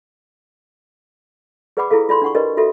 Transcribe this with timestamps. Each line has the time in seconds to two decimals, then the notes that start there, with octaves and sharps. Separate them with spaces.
1.77 G#4 B4 D5 F#5 B5 D6
1.90 E4 F4 G#4 A4 F5
2.09 F4 D5 B5 C6
2.22 D4 F#5 C#6
2.35 D4 G4 A#4 B4 D5 D#5
2.57 F4 F#4 A4 E5